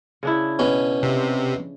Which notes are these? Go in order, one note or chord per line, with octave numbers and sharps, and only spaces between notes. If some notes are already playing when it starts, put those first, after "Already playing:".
C#3 D4 E4
B2 B3 C#4
C3